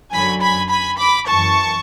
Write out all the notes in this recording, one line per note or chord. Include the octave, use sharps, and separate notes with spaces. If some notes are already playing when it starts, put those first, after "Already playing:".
F#2 D3 F#3 G#5 B5
G#5 B5
G#5 B5
B5 D6
F#2 E3 A5 C#6